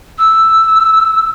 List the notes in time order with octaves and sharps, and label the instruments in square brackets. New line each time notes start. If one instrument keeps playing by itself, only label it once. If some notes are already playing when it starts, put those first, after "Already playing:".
[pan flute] E6